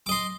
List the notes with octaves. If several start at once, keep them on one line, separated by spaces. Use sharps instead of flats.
D#5 C6 D6